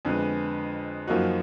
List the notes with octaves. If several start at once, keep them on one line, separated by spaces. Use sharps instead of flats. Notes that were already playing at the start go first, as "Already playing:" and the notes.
F2 D3 G#3 B3
F#2 F3 A#3 D#4 F#4